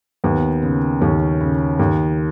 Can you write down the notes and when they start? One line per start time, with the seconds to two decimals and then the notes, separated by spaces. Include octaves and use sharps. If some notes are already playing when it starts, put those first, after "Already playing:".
0.24 D#2 B3
0.62 C#3
1.01 D#2 C#4
1.41 C#3
1.79 D#2